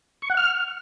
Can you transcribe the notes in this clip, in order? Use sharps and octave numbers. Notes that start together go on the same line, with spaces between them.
C#6
F#5
F6